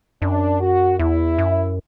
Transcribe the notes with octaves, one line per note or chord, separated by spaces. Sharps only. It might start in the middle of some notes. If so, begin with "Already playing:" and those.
F#2 D4
F#4
E2 E4
F#2